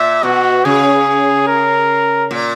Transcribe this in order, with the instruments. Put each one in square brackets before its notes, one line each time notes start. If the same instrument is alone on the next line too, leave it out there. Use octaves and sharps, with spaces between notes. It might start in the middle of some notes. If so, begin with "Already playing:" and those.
Already playing: [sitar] A#2 [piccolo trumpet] E5
[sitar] B2 [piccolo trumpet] F#4
[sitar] C#3 [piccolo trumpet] G#4
[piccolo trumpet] A#4
[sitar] A#2